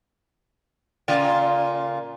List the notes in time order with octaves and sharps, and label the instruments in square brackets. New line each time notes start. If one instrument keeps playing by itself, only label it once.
[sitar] A#2 C#3 F4